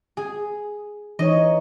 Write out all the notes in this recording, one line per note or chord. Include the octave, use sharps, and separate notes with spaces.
G#4
E3 D#4 C#5 D#5